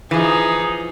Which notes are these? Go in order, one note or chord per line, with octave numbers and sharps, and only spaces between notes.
E3 F3 D#4 G#4